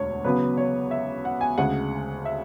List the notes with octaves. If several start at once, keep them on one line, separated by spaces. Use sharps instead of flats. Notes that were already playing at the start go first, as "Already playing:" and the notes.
Already playing: E1 D2 D3 C#5
E2 C#3 F#3 B3 B4
C#5
E5
F#5
G#5
D2 C#3 G#3 F#5
E5